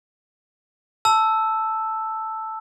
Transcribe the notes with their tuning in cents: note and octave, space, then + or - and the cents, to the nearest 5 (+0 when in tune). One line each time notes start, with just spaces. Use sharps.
A5 +0 E6 +0